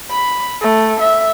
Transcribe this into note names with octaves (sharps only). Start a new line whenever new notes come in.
B5
A3
E5